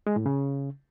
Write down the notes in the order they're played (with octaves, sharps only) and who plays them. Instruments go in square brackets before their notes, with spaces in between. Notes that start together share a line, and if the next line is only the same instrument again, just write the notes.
[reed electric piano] G#3
A2
C#3